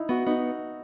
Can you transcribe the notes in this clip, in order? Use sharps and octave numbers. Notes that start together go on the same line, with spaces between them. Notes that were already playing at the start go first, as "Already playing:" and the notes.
Already playing: D#4 E4
B3 F#4
B3 D#4